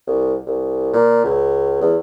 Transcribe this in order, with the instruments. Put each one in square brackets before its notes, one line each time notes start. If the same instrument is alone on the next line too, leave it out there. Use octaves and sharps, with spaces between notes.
[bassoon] C2
C2
A#2
C#2
E2